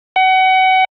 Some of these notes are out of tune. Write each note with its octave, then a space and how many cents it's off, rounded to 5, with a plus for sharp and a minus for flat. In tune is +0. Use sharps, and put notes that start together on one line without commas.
F#5 +30